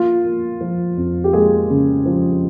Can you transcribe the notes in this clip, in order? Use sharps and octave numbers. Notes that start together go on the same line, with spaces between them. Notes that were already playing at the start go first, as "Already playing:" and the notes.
Already playing: A#3 F4
A#3
F3
F2
G4
G#3 A#3 G#4
C#3
F3